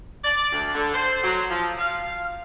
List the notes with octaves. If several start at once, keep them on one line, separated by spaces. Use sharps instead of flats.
D5
D2
D3
C5
F#3
F3
F5